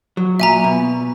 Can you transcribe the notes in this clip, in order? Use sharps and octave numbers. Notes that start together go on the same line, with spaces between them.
F#3
A#2 E5 G#5 A#5
B2